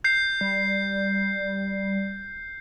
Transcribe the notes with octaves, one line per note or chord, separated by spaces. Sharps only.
G6 C7
G3